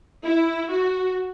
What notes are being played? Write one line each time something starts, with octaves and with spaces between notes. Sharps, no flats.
E4
F#4